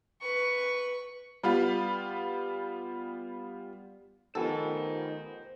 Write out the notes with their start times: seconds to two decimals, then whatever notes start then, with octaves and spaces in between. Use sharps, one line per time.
0.22 B4 C#6
1.43 G3 B3 F4
4.35 D#3 F3 B3 G4 A4 C5 G#5